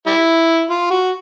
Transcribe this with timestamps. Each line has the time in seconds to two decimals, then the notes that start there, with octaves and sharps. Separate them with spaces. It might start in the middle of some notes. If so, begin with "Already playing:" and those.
0.07 G3 E4
0.70 F4
0.91 F#4